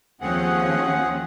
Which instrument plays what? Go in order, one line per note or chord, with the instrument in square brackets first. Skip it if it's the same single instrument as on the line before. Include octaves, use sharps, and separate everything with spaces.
[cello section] D#2 F3 C#4 [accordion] C4 G#4 F#5